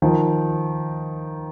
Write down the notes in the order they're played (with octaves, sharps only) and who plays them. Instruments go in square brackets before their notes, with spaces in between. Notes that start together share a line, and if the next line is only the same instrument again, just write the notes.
[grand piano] D#3 F3